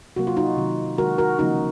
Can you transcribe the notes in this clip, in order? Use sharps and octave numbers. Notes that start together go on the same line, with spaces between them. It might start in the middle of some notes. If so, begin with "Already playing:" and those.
C3 F#3 A#3 F#4
F4
D#4 F#4
C3 D#3 F#3
D#3 G#3 F#4 A#4
F#4 A#4
C#3 F3 A#3 D#4 F#4